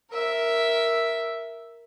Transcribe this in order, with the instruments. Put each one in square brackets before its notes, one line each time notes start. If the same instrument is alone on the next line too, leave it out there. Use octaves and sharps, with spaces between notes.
[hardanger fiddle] A#4 E5